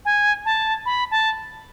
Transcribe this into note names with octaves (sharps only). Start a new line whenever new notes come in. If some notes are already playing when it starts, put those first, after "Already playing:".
G#5
A5
B5
A5